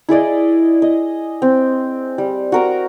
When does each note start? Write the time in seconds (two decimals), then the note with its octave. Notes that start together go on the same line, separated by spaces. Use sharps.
0.09 E4 G#4 D5 D#5
0.82 D#5
1.42 C4
2.18 G3
2.52 F#4 A#4 A#5